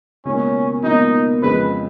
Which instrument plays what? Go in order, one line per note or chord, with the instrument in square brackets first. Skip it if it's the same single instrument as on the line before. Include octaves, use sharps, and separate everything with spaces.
[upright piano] C#2 B2 A#3 [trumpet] C#4
[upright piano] C#2 B2 A#3 [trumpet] D#4
[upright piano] F2 C#3 G#3 [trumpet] B4